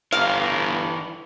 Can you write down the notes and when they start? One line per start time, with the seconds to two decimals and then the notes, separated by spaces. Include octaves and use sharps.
0.12 G1 E3 A#4 F5